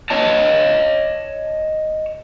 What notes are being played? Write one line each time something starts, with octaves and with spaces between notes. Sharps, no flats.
C#5 D#5 A5